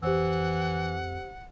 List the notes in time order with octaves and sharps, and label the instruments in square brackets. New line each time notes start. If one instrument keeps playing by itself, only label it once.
[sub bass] F2 [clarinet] E3 [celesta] G4 C5 E6 [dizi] F#5